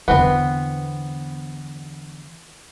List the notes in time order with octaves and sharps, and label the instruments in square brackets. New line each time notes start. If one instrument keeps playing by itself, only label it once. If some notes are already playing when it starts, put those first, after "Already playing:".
[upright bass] E2 D3 [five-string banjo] B3 C4 B4